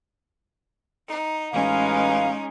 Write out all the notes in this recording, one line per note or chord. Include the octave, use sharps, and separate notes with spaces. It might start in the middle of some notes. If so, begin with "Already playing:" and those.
D#4
A1 G#3 C#4 D#4 B4 F5